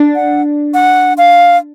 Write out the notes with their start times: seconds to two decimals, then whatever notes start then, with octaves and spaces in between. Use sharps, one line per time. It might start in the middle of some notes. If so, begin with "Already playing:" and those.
Already playing: D4
0.15 F#5
0.74 F#5
1.18 F5